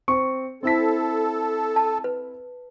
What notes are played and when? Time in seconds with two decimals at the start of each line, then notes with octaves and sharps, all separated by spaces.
0.08 C4 C#6
0.63 C4 E4 A4 B6
1.76 A5
2.04 B4